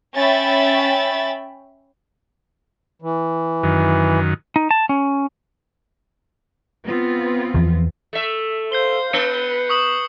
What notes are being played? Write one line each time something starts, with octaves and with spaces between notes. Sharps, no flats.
C#4 E5 G5 B5 A6
E3
F#2 D#3
D#4
A5
C#4
B3 C4 F4
E2 E3 F3
A3 E5
C5 F5 G6 C7 G7
B3 B4 C#7
C#6 D#6 F#7